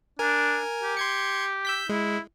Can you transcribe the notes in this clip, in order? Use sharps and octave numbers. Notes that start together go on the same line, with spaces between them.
D4 A#4 G#5
G4
C6 G#6 C#7
E6 G6 B6
G#3 E4